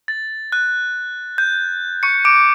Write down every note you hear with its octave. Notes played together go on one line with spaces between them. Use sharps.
A6
F#6
G6
C#6 C#7
D6 D7